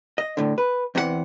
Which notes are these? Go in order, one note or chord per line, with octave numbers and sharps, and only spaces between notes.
D#5
D2 A2 D3
B4
E2 C3 E3 G4 F#5